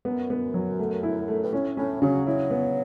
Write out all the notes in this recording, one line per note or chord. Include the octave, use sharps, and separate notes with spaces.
F#2 B3
B3
F#3
A3
E4
A3
G2
A2 C#4
A2 C#4
C#3 F#3
F#3 E4
B3